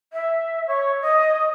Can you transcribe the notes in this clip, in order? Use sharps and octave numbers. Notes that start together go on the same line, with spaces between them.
E5
C#5
D#5